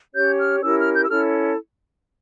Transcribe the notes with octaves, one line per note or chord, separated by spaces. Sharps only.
C#4 G4 C#5 G6
F6
C#4 E4 G4 A#4 E6
F6
G6
E6
C#4 E4 A4 F6